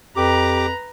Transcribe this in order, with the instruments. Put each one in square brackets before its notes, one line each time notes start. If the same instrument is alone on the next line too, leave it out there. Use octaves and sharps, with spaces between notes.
[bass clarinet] F2 [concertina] G4 D6 [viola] B4 A#5